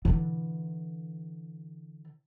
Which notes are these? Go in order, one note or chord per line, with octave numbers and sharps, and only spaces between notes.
D3 E3